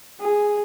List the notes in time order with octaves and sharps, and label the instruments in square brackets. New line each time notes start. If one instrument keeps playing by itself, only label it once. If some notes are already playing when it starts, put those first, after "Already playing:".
[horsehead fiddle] G#4